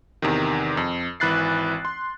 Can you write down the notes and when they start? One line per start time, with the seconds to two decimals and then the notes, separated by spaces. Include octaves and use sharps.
0.22 E2 C3 D#3
0.77 F2
1.20 G#1 E3 B5 F#6 A6 C7
1.85 C6